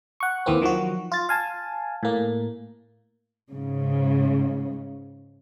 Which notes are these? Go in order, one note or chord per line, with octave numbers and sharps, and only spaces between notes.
F#5 C#6
D#2 E3 A#3 C4
D#3 F3 F#3 F#4
F4 A6
F5 G#5 A5
A2 A#3
G#2 C#3